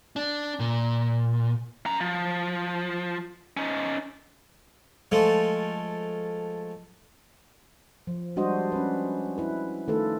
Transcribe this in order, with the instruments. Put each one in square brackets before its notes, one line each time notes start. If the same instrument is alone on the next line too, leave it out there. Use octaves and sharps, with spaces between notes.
[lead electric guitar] D4
A#2
C#4 A#5
F3
C#4 D#4
[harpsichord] F3 G#3 A3
[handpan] F3
G3 G#3 D4 F#4 C5 D#5
C#4 B4
E4 B4
D#3 A3 F4 A4 B4